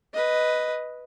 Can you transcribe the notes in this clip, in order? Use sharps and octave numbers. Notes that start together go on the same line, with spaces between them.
B4 D#5